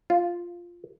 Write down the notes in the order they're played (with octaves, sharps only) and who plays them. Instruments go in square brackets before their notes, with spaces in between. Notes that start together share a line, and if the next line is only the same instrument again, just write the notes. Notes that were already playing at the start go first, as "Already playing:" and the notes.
[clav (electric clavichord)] F4